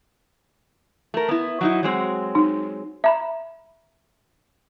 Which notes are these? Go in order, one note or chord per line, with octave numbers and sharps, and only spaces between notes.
A3 A#4
B3 E4
F#3 D#4 E4
F#3 G#3 C4
D#4
E5 A#5 B5